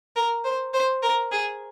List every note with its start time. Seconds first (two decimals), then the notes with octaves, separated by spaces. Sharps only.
0.16 A#4
0.44 C5
0.73 C5
1.03 A#4
1.32 G#4